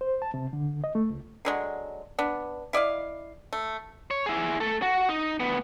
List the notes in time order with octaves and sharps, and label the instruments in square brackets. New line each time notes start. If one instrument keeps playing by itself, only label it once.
[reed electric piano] C5
A5
C3
D3
D#5
A3
C#2
[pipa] D3 F#3 G#3
B3 D4
E4 D5 D#5 F5
A3
[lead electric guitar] C#5
E4 G#4
A3 A4
F#4
D#4
D2 B3